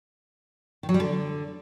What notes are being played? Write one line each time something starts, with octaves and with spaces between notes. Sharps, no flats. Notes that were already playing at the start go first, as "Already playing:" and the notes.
D#3
F#3
G3
D3